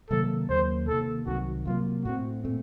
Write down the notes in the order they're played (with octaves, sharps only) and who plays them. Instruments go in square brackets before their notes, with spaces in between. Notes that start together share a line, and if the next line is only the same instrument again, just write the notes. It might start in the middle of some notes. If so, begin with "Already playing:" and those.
[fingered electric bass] C3 D#3 F#3 A#3 [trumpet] A4
[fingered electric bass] D#2 C#3 F#3 A#3 [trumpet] C5
[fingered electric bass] C3 D#3 A#3 [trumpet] A4
[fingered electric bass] C2 C3 D#3 F#3 [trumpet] F#4
[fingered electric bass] C3 F#3 A#3 [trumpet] F4
[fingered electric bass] A2 A3 C4 [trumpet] F#4
[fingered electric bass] A#2 A3 C4